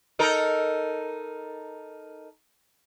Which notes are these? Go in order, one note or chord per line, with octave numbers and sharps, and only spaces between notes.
D#4 A4 A#4